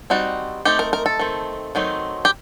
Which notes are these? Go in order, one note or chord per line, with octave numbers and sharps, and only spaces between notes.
G3 C4 D#4 F#4
A3 C4 D#4 G4
A#4
A#4
A4
D#3 A3 C4
D#3 F#3 A3 C4 D#4
G4